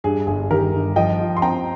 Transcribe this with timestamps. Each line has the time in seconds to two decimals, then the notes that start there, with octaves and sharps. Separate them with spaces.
0.04 G2 G#4
0.27 G1 G#4
0.50 D#3 G4 A#4
0.73 G1
0.96 F3 D#5 G5
1.19 F4
1.37 C6
1.42 C4 G5 A#5